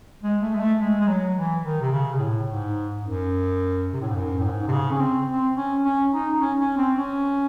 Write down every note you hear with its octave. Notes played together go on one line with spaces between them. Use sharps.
G#3
A3
G#3
A3
G#3
G#3
F#3
E3
D#3
C3
C#3
C3
A2
G#2
F#2
C3
A2
G#2
F#2
A2
G#2
C3
C#3
C#4
C4
C4
C#4
C#4
D#4
C#4
C#4
C4
C#4